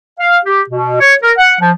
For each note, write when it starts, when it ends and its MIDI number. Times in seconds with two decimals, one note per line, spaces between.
0.20 0.37 77
0.45 0.61 67
0.70 0.99 47
1.00 1.13 73
1.21 1.31 70
1.38 1.55 78
1.60 1.71 53